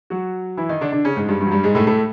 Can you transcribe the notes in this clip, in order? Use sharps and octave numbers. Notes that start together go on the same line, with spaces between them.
F#3 F#4
E3 E4
D#3 D#4
D3 D4
D3 D4
C#3 C#4
G#2 G#3
G2 G3
G2 G3
F#3
G2 G3
G#2 G#3
A2 A3
A2 A3